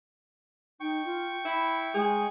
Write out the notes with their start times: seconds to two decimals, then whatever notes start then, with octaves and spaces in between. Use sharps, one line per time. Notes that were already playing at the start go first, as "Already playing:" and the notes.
0.80 D#4 G5 C#6
1.05 F4
1.45 E4 B5
1.94 G#3 G#4